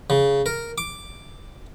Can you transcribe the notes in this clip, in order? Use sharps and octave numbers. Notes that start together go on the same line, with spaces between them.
C#3
A#4
D6